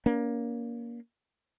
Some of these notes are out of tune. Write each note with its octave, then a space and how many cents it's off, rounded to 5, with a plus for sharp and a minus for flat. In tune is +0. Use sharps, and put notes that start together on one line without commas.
A#3 +15 C#4 +45